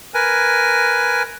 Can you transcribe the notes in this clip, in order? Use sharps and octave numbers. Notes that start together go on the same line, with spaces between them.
A#4 B4 G#5